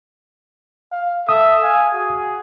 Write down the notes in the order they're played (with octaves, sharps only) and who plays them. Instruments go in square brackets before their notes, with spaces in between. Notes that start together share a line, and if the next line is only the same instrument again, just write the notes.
[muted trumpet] F5
[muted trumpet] A4 [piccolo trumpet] E5 [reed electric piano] D#6
[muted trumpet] F5 [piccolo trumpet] G#5
[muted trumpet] F#4 [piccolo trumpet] G#4